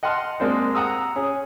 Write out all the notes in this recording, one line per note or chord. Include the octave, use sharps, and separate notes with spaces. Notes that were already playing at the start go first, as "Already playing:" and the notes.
D#5 F#5 A5 C6 F6
G#3 A#3 C4 D4 C5
F#5 A#5 D#6 E6
C#4 G#4